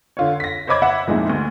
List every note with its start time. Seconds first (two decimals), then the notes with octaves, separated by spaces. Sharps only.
0.17 D3 F4 C#5
0.40 A#6 B6
0.67 C5 C#5 D#5 B5 D6 G#6
0.82 E5 F#5 B5
1.07 F2 A#2 G#3 D#4 E4
1.30 D2